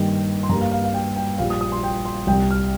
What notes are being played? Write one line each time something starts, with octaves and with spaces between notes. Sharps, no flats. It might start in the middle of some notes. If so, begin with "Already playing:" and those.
Already playing: G2 D#3 G3 A#3 G5
C6
G2 G3 A#3 A#5
F5
F5
F5
G5
G5
A#1 A#2 G3 F5
D#6
D#6
C6
G5
C6
C2 C3 G3 G5
F6